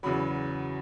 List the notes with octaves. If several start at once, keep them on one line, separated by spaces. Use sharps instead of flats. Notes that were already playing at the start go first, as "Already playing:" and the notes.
E2 C#3 F#3 B5